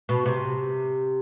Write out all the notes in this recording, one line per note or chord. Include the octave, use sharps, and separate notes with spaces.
B2
C3